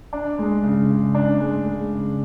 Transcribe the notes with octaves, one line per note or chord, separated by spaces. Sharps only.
D4
G#3
C#3
C#3
D4
G#3
G#3
C#3